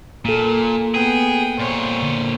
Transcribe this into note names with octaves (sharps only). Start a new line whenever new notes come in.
A#2 A#3 A4
B3 G#4 G5
A#2 C5 C#5
D3